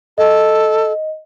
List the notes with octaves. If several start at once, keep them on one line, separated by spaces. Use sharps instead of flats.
A4 D#5